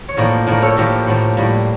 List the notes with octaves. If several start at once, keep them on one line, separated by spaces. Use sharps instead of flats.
C#5
A2 F3 A#3 A#4 D5
A2 F3 A#3 A#4 D5
A4 C#5
A2 F3 A#3 G4 A#4
A2 F3 A#3
A2 G3 A#3